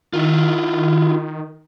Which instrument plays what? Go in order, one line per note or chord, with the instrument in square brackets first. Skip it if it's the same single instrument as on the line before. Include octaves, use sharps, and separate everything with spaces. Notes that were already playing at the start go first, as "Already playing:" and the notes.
[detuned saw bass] D#3 [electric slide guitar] E4 F4